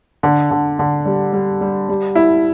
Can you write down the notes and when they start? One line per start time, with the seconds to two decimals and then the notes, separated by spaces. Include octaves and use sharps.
0.23 D3
0.51 D3
0.79 D3
1.05 G3
1.33 G3
1.61 G3
1.89 G3
2.15 E4